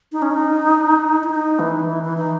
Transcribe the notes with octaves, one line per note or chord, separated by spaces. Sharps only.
D#4
C#4
D#4
E4
D#4
E3
E3
E3
D#4